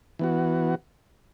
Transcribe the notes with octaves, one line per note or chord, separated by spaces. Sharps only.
E3 B3 F#4